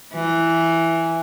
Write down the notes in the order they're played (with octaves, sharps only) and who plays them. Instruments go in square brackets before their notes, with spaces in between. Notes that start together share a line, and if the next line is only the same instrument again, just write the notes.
[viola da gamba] E3